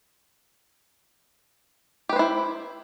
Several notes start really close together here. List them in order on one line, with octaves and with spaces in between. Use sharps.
G4 B4 C5 E4